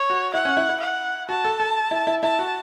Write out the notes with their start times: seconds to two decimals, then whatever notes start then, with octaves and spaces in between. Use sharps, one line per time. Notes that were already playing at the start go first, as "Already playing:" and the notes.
Already playing: C#5
0.10 F#4
0.34 E4 F#5
0.45 C#4
0.57 E4
0.69 E4
0.80 F#5
1.29 F#4 A5
1.45 A4
1.60 A4
1.91 E4
2.07 E4
2.23 E4 A5
2.39 F#4